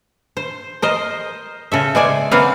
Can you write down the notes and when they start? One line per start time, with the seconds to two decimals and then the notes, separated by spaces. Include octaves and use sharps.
0.37 C5
0.82 A#4 C5 D#5
1.72 C#3 A4 E5
1.95 G#3 C5 D5 G#5
2.31 C#3 F#3 A#3 C4 B4 F5